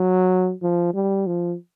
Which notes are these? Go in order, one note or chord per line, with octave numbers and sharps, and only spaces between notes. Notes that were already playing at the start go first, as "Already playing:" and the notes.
Already playing: F#3
F3
G3
F3